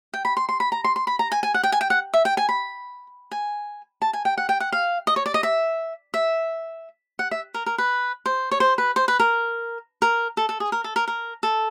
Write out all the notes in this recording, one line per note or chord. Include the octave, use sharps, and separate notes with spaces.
G5
B5
C6
C6
B5
A#5
C6
C6
B5
A#5
G#5
G#5
F#5
G5
G#5
G5
F#5
E5
G5
G#5
B5
G#5
A5
G#5
G5
F#5
G5
F#5
F5
D#5
C#5
D5
D#5
E5
E5
F#5
E5
A#4
A#4
B4
C5
C#5
C5
B4
C5
B4
A#4
A#4
A4
A4
G#4
A#4
A4
A#4
A#4
A4